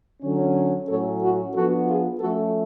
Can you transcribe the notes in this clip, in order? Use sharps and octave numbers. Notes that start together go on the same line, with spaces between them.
D3 F#3 C#4
A2 F#3 A3 C#4 A4 C#5
F#4
F3 B3 D4 F#4 A4
F4 G#4
F3 A3 C#4 F#4 A4